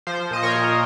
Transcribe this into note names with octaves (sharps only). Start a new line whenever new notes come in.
F3 C5
A#2 D#5
A#4 C#5
A#2